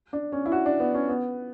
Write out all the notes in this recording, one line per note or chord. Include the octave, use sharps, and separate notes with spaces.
D4
C#4
E4
F#4
D4
B3
C#4
B3